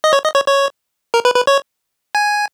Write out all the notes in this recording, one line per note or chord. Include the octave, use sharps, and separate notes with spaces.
D#5
C#5
D#5
C#5
C#5
A#4
B4
B4
C#5
G#5